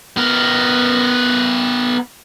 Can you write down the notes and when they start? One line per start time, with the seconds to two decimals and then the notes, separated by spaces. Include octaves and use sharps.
0.17 B3 A#4